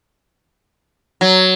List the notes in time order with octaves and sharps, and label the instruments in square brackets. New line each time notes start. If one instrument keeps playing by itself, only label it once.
[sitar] F#3